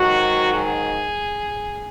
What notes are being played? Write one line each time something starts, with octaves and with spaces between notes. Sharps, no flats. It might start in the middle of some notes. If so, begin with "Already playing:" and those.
Already playing: G#2 D#3 F#3 F#4
G#4